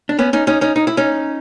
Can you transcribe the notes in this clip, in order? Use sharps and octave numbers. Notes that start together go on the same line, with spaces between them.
D4
B3 C#4
C#4 D#4
C#4 D#4
C#4 D#4
D#4
E4
C#4 D#4